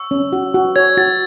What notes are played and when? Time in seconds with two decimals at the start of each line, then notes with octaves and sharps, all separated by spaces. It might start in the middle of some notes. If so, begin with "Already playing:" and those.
Already playing: C#6 E6
0.11 C#4
0.33 F#4
0.54 F#4
0.76 C#5 G#6
0.97 F#4 A6